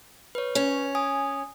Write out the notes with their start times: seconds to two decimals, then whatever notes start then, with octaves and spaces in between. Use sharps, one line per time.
0.35 B4 C#5
0.55 C#4
0.95 G#5 D#6